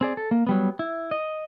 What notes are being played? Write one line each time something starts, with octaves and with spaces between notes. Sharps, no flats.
C4 G#4 D5
A4
A#3
F#3 G3 B3
E4
D#5